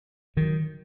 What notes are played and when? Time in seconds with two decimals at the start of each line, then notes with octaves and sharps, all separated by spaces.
0.37 D#3 F#3